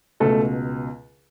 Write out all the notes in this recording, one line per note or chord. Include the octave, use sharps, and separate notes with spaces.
C#2 B2 A3 A4